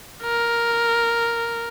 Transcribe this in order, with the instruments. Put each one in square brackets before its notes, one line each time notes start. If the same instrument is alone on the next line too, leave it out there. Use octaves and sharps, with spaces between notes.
[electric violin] A#4